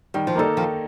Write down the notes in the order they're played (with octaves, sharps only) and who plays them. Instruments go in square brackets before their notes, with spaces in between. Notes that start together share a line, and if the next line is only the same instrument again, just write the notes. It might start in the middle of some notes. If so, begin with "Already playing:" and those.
[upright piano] D#3 [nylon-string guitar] G3
[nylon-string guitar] F3
[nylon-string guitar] G3 [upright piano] A#3 D#4 A4
[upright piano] D#3 [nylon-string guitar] F3